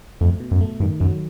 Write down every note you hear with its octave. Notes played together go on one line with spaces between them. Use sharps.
F2 A3
B2
F#2
A3
G2 D#3
F#2 F#3